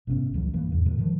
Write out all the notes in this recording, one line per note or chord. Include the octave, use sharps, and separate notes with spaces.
G#1 C3 B3 C#4
C#2 E3 F#3 G3
G2 E3 A#3
E2 G#2 C#3
A2 D3 G#3
D3 D#3 F3